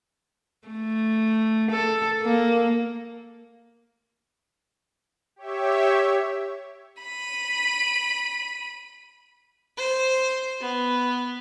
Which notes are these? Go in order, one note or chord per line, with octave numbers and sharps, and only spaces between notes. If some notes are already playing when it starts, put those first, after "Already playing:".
A3
A4
A#3
G4 C#5 E5
B5 D#7
C5
B3